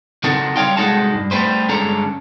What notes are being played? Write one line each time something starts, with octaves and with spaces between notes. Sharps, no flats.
C#3 C4 D#4 F#4 A4 A#4
G3 C#5 F5 G5 C6
C2 G#3 D#4 F#4 A4 A5
G2
G3 A3 G#4 B4 C5
G2 D3 G#3 C#4 A4 A#5